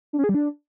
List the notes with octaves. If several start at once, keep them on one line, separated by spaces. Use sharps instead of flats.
D4
C#4
G#4
G3
D4